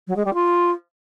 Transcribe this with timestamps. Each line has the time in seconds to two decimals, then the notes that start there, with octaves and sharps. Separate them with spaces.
0.07 F#3
0.16 G#3
0.25 G3
0.34 F4